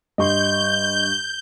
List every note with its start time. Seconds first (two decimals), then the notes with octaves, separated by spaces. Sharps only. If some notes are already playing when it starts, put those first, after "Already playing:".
0.18 G2 G4 D#5 C6 C#6 G6